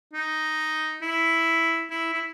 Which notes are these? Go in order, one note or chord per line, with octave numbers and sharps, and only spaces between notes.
D#4
E4
E4
E4